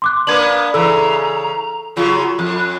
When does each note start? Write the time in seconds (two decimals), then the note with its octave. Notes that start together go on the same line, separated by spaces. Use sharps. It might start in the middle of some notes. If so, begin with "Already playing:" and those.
0.02 C6 D6 F#6
0.27 A#3 B3 D4 B4 G#6 F#7
0.74 C#3 E3 A4 A#5 E6
1.97 C#3 F#3 F4
2.39 F2 F#6